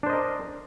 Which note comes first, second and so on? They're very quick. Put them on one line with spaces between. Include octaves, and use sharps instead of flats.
D4 C5 D#5 A#4